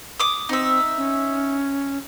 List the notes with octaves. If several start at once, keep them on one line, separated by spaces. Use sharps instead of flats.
D6 D#6
C4 D#4 E5
C#4